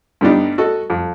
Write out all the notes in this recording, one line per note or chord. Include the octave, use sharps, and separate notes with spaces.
G2 D3 G3 B3 D4 D#4
F#4 A4 D#5
F2